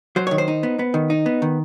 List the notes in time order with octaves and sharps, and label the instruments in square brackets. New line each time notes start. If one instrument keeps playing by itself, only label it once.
[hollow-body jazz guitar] F#3 C5
D#3 C#5
C5
D#4
B3
B3
D#3
D#4
B3
D#3